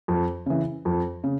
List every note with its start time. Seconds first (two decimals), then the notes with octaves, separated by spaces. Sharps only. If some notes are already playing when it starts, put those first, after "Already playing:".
0.08 F2
0.46 C#3 E3
0.85 F2
1.24 C#3